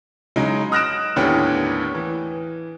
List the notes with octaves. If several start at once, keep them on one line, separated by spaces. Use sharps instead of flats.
C#3 F#3 G#3 C#4 D#4
D#6 F6 F#6 A#6 D7 E7
D#2 A2 D3 B3 C#4 G4
E3